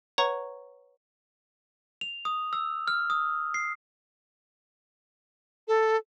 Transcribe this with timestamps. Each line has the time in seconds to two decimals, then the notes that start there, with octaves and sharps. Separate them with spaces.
0.18 B4 C#5 F#5 A#5 C#6
2.01 F7
2.25 D#6
2.53 E6
2.88 F6
3.10 D#6
3.54 C7
5.68 A4